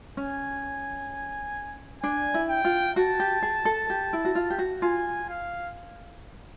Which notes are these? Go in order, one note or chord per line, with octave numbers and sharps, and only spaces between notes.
C#4 G#5
D4 G#5
E4
G5
F4
F#4 A5
G4
G#4
A4
G4
E4
F#4
F4
G4
F#4
F4 G#5
F5